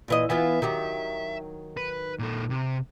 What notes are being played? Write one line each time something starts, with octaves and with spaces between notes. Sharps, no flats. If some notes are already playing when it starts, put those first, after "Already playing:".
A#2 E3 D#5
E3 B3 F4 E5
D#3 F#3 G4
B4
A#2 A4
C3